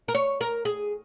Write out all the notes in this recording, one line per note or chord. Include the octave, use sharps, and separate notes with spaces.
A#4
C#5
A#4
G#4